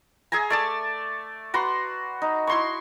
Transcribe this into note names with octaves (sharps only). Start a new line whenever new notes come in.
G#4 E5 G#5 A#5
A3 D5 A5
F#4 B4 A#5 C6
D#4
E4 C6 C#6